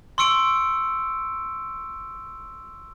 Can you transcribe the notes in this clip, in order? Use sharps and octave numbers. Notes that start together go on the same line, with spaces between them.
C6 C#6 E6 C#7 D7